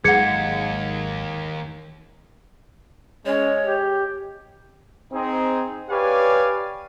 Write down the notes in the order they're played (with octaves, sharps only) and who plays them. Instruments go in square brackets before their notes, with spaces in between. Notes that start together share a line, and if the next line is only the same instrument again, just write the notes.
[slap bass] G#1 F#3 G#3 [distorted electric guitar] D#2 [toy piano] G#4 F#5 [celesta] G#6 C#7
[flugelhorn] G#3 [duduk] C#4 [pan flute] C#5
[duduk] G4
[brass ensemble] C4 D#4 G#4
G4 B4 C#5 D5 F5 G#5